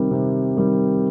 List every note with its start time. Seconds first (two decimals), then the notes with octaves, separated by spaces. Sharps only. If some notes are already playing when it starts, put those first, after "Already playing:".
Already playing: C3 D#3 G3
0.11 C3
0.57 D#3 G3